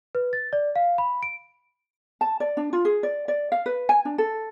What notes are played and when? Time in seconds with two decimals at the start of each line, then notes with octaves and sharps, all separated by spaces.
0.15 B4
0.33 A6
0.53 D5
0.76 F5
0.98 B5
1.23 D7
2.21 A5
2.40 D5
2.57 D4
2.73 F4
2.85 G#4
3.03 D5
3.28 D5
3.52 F5
3.66 B4
3.89 G#5
4.05 D4
4.18 A4